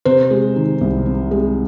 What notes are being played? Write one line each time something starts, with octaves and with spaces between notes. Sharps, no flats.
C3 C5
G#3
D#3
C2
C3
G#3